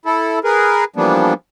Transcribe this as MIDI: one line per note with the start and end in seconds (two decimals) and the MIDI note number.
0.06 0.39 64
0.06 0.39 69
0.44 0.84 68
0.44 0.84 70
0.44 0.84 71
0.96 1.33 52
0.96 1.33 53
0.96 1.33 55
0.96 1.33 58
0.96 1.33 59
0.96 1.33 62